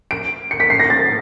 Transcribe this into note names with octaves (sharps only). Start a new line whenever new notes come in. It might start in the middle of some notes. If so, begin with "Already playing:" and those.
D7
C#7
B6
C7
A#6
A6